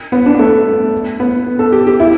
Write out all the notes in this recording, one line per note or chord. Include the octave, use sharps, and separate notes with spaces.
B3
D4
B3
A3
B3
A4
G4
G4
E4